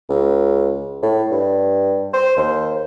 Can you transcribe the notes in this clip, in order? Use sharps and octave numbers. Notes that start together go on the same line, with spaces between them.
C#2
A2
G2
C5
D#2